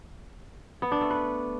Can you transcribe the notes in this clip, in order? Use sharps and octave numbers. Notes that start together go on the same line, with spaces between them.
B3
D4
A3
B4